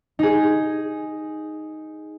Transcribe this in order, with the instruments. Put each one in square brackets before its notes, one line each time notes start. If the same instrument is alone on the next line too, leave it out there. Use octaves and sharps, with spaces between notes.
[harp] D#4 G#4